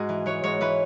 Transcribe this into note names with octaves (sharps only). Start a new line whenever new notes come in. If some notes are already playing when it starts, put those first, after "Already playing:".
Already playing: G#2 F#4 G#4
E3
E3 C#5
G#2 C#5
E3 B4